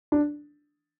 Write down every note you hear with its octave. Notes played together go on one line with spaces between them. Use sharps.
D4